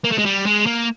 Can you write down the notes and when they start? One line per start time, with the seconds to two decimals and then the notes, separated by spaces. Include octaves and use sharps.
0.04 A#3
0.11 A3
0.18 G#3
0.25 G3
0.46 G#3
0.67 A#3